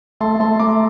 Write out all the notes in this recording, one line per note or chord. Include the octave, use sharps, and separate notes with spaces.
A3 A5 C6
A3 A5 C6
A3 A#5 D6